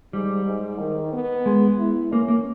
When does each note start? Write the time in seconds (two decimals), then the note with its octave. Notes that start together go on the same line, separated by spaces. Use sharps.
0.13 G#2 G3
0.46 G#2
0.79 D#3
1.12 B3
1.46 G#3
1.78 E4
2.11 A#3 C#4
2.28 A#3